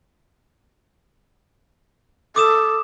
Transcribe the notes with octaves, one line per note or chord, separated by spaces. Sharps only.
A4 D6 D#6 E7